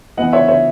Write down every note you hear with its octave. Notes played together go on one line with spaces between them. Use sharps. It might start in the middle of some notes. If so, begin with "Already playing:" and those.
E3 B3 D#5 F#5
C#5 E5
C#5 E5